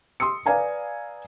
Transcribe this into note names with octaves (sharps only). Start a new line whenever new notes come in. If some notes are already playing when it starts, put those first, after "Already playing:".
C6 D#6 E6 C#7
B4 D5 F5 G#5 A#5